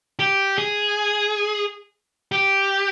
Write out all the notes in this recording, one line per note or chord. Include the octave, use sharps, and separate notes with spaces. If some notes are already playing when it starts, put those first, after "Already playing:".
G4
G#4
G4